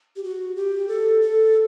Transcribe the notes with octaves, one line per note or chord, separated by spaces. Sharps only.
G4
F#4
G4
A4
A4